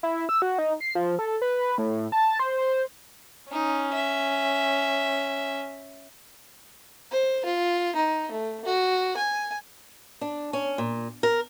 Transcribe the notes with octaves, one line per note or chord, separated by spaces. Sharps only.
E4
E6
F#4
D#4
C7
F3
A4
B4
A2
A5
C5
C#4 D#4
E5
C5
F4
D#4
A3
F#4
G#5
D4
C#4
A#2
A#4